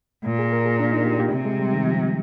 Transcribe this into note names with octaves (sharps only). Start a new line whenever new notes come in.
A#2
G#4
A#4
G#4
D4
D#4
G4
G4
C3
G#3
G3
D#3
F3